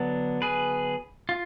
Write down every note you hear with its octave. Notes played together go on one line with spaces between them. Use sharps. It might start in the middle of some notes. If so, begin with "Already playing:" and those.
Already playing: D3 F#3 B3 D4
G#4 B4
F4